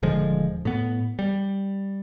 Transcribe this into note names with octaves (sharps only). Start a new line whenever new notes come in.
D#1 D3 F3 G#3
A2 B3
G3